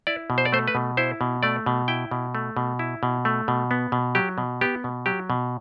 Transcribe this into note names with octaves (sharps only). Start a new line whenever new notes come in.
E4 D5
B2
C5
D5
A3 C5
B4
B2
E4 C5
B2
A3 D5
B2
E4 G5
B2
A3
B2
E4
B2
A3
B2
B3
B2
F#3 G4
B2
B3 G4
B2
F#3 G4
B2